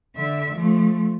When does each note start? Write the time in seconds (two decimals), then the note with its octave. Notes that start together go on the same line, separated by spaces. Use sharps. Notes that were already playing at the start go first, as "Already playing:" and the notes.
0.16 D3 E5
0.54 F3 A3